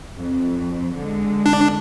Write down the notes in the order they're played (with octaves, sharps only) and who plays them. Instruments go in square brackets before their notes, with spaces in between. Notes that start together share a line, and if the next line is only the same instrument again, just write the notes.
[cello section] F2
D3 G#3
[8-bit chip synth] D4